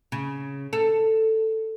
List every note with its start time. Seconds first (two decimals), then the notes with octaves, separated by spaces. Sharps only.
0.12 C#3
0.73 A4